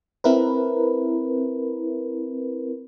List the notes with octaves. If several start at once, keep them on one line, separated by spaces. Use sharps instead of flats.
C4 E4 A#4 B4